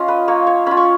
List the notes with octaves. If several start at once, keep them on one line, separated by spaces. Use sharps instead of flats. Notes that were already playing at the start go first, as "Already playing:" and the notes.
Already playing: C#4 F4 D#5 F5
B4
A#3 C#5
C#5
C#4 F4 B5
C#6